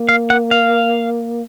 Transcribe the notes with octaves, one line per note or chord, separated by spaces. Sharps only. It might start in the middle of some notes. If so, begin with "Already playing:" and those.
Already playing: A#3
F5
F#5
F5